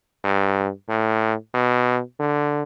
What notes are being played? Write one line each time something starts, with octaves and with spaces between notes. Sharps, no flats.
G2
A2
B2
D3